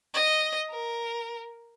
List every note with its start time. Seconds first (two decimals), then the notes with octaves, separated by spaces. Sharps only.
0.14 D#5
0.70 A#4